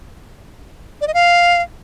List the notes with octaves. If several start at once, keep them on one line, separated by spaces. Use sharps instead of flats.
D5
D#5
F5